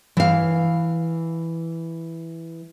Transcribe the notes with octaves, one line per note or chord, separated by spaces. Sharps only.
E3 F5